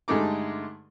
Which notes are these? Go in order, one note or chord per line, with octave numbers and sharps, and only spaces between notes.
G2 D3 G#3 A3 D#4 D6